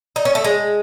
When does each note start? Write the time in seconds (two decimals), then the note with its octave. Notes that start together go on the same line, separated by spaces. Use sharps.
0.16 D#4
0.25 C#4
0.35 A3
0.44 G#3